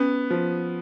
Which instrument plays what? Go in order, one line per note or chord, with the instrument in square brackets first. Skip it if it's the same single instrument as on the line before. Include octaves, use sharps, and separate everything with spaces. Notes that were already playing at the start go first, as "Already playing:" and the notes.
Already playing: [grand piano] B3 [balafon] C#4
[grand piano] F3